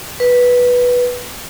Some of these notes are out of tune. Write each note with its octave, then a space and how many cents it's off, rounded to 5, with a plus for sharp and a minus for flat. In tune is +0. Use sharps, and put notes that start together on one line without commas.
B4 -10